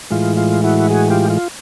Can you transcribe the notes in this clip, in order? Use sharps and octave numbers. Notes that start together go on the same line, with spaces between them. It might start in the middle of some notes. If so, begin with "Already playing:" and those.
A2 E3 G#3 F4
F4
E4 F#4
F#4 G#4
F4 G4
F4